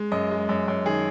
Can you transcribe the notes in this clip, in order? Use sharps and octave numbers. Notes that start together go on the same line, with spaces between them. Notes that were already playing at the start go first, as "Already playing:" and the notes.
Already playing: G#3
F#2 D#5
G#3
F#2
F#2
D#3 G#4